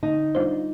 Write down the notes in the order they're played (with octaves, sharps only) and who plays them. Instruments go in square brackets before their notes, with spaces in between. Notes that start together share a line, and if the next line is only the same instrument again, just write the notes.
[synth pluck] D3 [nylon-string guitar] D#4
[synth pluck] G3 D4 F4 C5